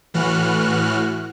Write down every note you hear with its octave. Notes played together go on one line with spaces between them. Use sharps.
A2 E3 F#4 F6 F#6